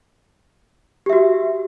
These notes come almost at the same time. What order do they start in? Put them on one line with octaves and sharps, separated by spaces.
G4 E5 F#4